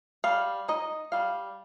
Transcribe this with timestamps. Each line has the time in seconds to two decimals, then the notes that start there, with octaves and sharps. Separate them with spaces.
0.24 G3 F5
0.68 D#4 D#5
1.12 G3 F5